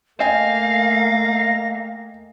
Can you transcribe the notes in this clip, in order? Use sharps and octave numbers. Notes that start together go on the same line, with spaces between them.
A3 A#3 D#5 F5 G5 G#5 A#6